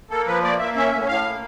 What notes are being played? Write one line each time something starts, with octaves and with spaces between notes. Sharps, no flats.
A#3 A4
F3 B4
A#3 D5
A#3 E5
C#4 E5
A2
A2 F5
A#3